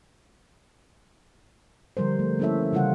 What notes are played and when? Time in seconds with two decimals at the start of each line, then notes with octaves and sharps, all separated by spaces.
1.97 D3 F3 G3 A#4 C5
2.19 A3
2.39 A#3 C#4 E4 A4 C#5 E5
2.73 C#3 E3 G3 F4 G4 F#5